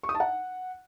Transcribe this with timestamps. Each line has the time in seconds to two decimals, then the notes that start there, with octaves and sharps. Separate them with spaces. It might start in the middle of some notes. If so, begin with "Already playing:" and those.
0.03 C#6
0.09 D#6
0.15 A5
0.20 F#5